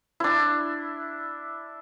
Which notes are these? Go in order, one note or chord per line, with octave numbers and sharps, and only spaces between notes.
D4 E4